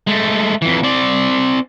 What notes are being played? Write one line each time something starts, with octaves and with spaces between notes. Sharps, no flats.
G#3 A3
F2 E3
C4 D5